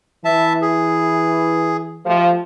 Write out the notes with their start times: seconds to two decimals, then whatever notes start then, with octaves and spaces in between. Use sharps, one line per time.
0.25 E3 E5 A5
0.62 G#4
2.05 F3 A3 G4